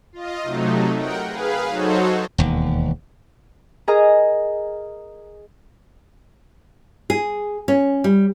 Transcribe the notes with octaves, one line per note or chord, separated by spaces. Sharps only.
F4 D#5
C3 F#3 A3 D#4
A#4 F#5 G5
G#4 B4 F5
F#3 D#4 F#4 A4 C5 C#5
E1 D#2
G#4 A#4 D#5 A#5
G#4
C#4
G3